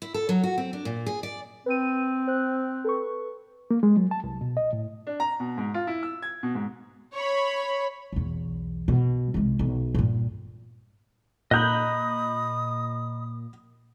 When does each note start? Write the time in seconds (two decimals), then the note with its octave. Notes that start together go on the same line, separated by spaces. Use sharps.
0.02 E4
0.14 A4
0.29 F#3
0.43 F#4
0.58 C4
0.73 D4
0.85 A#2
1.06 G#4
1.23 D5
1.66 C4 B4 D#7
2.27 C5 F#6
2.84 A4 B4 C#6
3.71 A#3
3.83 G#3
3.97 F#3
4.11 A5
4.24 C2
4.41 B2
4.57 D#5
4.73 A2
5.07 D4
5.20 A#5
5.40 B2
5.58 G#2
5.74 F4
5.87 E4
6.03 E6
6.22 G#6
6.43 B2
6.55 G#2
7.14 C#5 B5
8.12 B1 E2
8.88 B2
9.34 C2 G#3
9.59 B1 D#3
9.95 G2 A#2
11.51 A#2 D#5 A#5 B5 D#6 F#6 G6